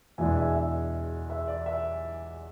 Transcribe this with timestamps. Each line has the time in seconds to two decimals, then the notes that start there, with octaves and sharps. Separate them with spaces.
0.18 E2 B2 G#3 D4 E5 G#5
0.36 E5 G#5
0.55 E5
1.30 E5
1.48 D5
1.66 E5